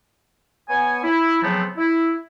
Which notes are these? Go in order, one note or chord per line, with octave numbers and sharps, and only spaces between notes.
B3 C#5 G#5
E4
C#3 F3 F#3 A3 B3 C4
E4